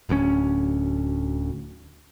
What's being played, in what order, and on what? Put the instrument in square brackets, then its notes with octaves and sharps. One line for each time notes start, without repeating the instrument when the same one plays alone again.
[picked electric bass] D1 D2 A#3 C#4